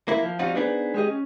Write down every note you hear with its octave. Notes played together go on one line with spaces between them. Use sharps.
A#3 E4
F3
F3 G3 C4 D#4 F4 F#4
B3 D4 D#4 G#4 B4 C5
G#3 G4 G#4 D#5
C#4